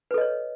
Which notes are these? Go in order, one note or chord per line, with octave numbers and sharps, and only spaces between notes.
A4 B4 C#5 D#5